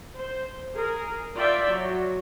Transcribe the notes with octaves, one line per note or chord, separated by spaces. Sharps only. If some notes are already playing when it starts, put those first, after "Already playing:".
C5
G#4 A#4
F4 D5 E5 G5
F#3